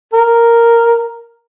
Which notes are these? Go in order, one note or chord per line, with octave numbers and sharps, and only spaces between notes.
A#4